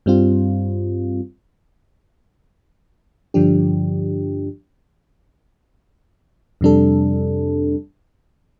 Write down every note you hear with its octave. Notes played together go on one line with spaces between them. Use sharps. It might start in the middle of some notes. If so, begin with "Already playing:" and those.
G2 G3 C4 F4
G2 D3 F3 D4 G4
F2 C3 G3 D4 A4